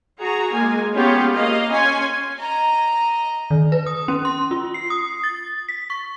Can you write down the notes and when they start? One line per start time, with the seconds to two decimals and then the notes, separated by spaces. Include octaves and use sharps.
0.19 F#4 G#4 A#5
0.51 G#3 A#3 G#5
0.95 B3 C#4 F4 G4 G#4
1.33 A#3 D#5 F5
1.71 C#4 G#5 C6
2.39 D#5 A#5
3.51 D#3
3.72 B4
3.86 D#6
4.08 C#4
4.25 C6
4.51 F4
4.74 C7
4.90 D#6
5.23 A6
5.69 B6
5.90 C#6